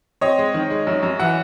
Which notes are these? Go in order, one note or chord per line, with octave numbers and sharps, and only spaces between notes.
C4 C#5 D#5
G#3
D#3
G#3
F#2
F#2
E3 E5 F#5